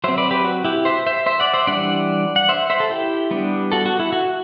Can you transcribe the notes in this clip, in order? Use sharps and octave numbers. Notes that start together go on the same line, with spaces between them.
F#3 C4 C5 E5
B4 D5
G4 B4
F#4
E4 G4
C5 E5
C5 E5
C5 E5
D5 F#5
C5 E5
E3 G3 D4 D5 F#5
F#5
C5 E5
C5 E5
A4
E4 G4
G3 B3 D4
F#4 A4
F#4
E4
F#4